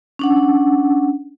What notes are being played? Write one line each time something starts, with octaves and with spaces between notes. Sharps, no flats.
C#4 D4 F#5